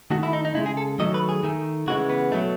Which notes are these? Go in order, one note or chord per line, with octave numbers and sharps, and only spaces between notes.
D#3 A3 F#4
E4
D#4
D#4
C#3 G#3 E4
G#4
A4
D#3 F#3 A3 D#5
B4
G#4
D#3 A3
C#3 E3 G#3 F#4
B3
B2 F#3 A3